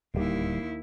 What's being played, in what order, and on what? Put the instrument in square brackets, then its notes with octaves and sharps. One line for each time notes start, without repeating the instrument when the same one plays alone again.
[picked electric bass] D1 G3 [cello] D#2 E4